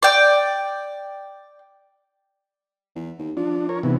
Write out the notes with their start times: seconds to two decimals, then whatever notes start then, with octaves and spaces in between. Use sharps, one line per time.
0.03 D5 G5
2.95 E2
3.19 D#2
3.37 F3 D4
3.69 A#4 C#5
3.83 G#2 C3 E3 B3